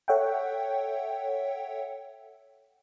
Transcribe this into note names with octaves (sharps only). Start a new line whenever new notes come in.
A4 C#5 E5 F#5 G5